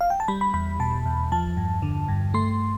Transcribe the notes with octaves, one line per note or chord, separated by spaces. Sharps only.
F5
G5
A5
G3 B5
B5
E2 B5
B2 A5
E2
F3 A5
G2
D3
G2
A3 C6